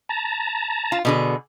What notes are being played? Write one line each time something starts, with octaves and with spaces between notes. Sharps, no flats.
A5 A#5
F4
B2 D3 G#4